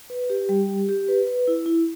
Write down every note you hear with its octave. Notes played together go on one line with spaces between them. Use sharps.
B4
G4
G3
G4
G4
B4
B4
E4
E4